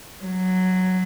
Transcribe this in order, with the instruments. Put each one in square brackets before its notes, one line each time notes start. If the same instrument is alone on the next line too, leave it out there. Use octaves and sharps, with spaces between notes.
[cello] F#3